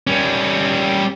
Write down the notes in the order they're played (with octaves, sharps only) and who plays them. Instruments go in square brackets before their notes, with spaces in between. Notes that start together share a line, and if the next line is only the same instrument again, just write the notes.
[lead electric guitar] G3 C#4